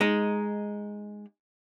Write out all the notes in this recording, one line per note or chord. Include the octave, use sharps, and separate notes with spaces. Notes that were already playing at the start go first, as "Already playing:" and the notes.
G#3 D#4